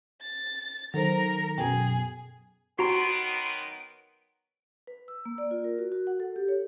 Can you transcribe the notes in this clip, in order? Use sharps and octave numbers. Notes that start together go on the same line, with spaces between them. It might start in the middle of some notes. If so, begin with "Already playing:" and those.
A6
D#3 F#3 A4 A#4 C5 A#5
F#2 B2 G#4 G5
D#3 F#3 B3 F#4 A#5 C6 D7
B4
E6
A#3
D5
F4
A#4
F#4
F#4
F#5
A4
G4
C#5